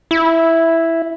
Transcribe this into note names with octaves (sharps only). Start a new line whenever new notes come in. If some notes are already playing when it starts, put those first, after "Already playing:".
E4